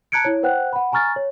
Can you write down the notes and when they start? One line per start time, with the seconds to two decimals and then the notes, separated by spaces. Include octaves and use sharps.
0.12 A5 A#5 F#6 G#6 C#7 D7
0.25 E4 C#5
0.43 B4 C5 F#5 G5 F#6
0.73 F#5 B5
0.92 G#5 A#5 C#6 F6 A6
1.16 C#5